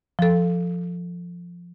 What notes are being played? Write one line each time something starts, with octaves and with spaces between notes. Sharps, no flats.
F3 A4